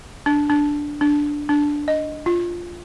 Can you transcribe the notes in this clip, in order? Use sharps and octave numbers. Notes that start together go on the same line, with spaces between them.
D4
D4
D4
D4
D#5
F4